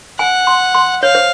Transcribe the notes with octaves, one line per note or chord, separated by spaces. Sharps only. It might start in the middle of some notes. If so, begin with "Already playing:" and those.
F#5 G#5
C6
C6
C#5 F5
C5